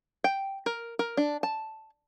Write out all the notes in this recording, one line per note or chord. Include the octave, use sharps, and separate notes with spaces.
G5
A#4
A#4
D4
A5